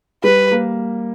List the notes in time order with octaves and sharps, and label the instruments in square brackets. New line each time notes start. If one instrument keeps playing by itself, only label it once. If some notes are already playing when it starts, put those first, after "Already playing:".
[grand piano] G3 [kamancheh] B4
[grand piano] A#3